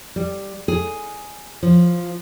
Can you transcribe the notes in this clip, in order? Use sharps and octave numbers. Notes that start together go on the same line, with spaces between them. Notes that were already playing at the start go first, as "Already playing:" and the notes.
G3
G#4
F3